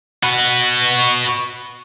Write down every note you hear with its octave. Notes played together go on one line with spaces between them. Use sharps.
F#4 B4